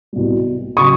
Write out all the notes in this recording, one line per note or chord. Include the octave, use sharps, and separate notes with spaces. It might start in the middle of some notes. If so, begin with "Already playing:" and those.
C2 B2 G3
C#3 F#3 C#6 D#6